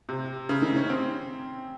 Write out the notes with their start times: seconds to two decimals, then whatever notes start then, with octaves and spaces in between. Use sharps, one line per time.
0.09 C3
0.49 C#3
0.62 D#3
0.76 C#4
0.90 C4